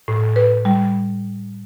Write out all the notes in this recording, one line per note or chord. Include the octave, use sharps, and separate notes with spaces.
A2
B4
G3